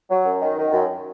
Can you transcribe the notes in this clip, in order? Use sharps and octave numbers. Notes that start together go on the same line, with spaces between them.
F#3
F#2
D#3
D#3
F#2